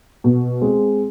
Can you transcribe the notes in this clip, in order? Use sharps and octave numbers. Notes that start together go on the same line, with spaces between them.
B2
G#3 C4